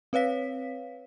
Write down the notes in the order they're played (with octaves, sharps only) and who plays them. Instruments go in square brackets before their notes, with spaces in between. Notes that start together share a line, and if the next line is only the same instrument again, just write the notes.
[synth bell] C4 B4 C#5 F5 B6